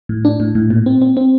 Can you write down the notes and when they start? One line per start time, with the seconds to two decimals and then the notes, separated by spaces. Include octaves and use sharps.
0.09 A2
0.25 D4
0.40 A2
0.55 A2
0.70 A#2
0.86 C4
1.02 C4
1.17 C4